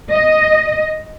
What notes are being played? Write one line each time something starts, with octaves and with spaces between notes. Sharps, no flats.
D#5